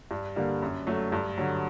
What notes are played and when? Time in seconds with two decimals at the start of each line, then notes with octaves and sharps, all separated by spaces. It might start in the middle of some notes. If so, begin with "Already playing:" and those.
0.11 G2
0.36 D3 G3 A#3
0.62 F#2
0.87 F#3 A3
1.12 G2
1.38 D3 F#3